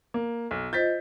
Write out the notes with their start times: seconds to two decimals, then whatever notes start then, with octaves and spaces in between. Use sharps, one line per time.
0.14 A#3
0.51 B1
0.73 F4 C5 D#5 G6 A6 B6